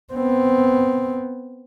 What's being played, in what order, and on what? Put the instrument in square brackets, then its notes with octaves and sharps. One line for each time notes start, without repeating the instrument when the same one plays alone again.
[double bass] B3 C4